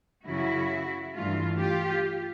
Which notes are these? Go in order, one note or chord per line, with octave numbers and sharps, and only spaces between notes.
F#2 C#3 F#3 E4 F#4
G2 E3 A3 F4
F4 G4